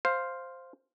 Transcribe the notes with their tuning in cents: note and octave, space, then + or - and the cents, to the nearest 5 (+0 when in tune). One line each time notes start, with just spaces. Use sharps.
C5 +0 F5 +0